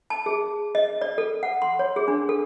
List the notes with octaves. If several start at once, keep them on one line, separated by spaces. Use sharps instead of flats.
A5
G#4
D#5
D5
A4
F#5
C6
C#5
G#4
D4
A4